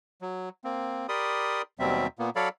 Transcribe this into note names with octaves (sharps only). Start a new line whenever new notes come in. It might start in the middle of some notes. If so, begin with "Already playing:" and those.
F#3
A#3 C4
G4 A#4 D5 B5 C6 D#6
D#2 B2 F#3 G3 C4 E5
A#2 A#3 B3
F#3 A4 C#5 D5 F5 B5